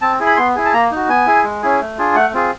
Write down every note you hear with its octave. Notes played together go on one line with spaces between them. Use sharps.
C4 A5
E4 G#4
B5
B3 C6
E4 G#4
A5
A#3 A#5
D#4 F#4
B3 G#5
E4 G#4
G#3
C#4 E4 G#4
A3
D4 F4 G#4
A3 F#5
C4 F4 G#4